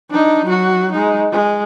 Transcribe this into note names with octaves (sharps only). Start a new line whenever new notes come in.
D4 D#4
F#3 F#4
G#3 D#4
G#3